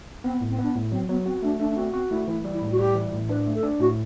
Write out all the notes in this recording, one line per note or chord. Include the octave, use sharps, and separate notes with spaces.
B3 C4
A2
C4
B3 D4
A2
F#3 C4
F#3 B3
C4 F#4
A3 D4
A3 D4
D4
C4 F#4
C4 F#4
A3 E4
E3 E4
G3
E4
A2
F#4
G3 G4
E3
A2
D4 B4
A3
A4
D4
A2 F#4